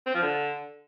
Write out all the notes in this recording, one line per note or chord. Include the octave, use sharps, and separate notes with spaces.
C4
F3
D3